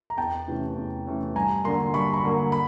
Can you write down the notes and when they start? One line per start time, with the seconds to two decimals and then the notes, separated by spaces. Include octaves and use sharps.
0.10 A#5
0.17 E2 G5 A5
0.48 C3 E3 A3 C#4
0.76 E2
1.07 C3 E3 A3 C#4
1.35 G2 G#5 A#5
1.64 D3 F#3 A#3 A#5 C6
1.94 G2 B5 C#6
2.14 B5 C#6
2.24 D3 F#3 A#3
2.52 B5